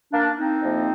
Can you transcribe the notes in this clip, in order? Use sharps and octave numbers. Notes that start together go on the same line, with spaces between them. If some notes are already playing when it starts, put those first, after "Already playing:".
A#3 D4
C4 D#4
F2 C3 F3 A#3